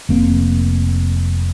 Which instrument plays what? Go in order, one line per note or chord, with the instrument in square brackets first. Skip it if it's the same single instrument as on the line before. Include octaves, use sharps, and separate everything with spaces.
[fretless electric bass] F1 A#3 C4